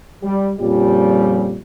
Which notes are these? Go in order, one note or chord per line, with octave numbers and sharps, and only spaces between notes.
G3
F2 A#2 C#3 F3 G3